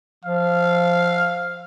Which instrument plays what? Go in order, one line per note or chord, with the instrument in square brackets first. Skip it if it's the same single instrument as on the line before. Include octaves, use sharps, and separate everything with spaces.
[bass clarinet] F3 [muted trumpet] F5